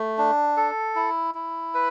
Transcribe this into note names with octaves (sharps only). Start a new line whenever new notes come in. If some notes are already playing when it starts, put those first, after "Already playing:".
Already playing: A3
D4
A4
E4
E4
B4